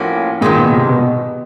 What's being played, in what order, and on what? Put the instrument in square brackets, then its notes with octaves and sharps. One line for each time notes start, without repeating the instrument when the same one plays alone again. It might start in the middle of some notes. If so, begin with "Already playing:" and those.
Already playing: [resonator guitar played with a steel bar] A2 F3 A#3 C#4 F#4
[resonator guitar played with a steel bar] G2 D#3 G#3 [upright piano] A#2
[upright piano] B2
C3
B2